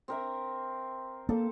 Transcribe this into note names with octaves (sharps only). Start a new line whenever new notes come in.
C4 A#4 E5
A#3 A4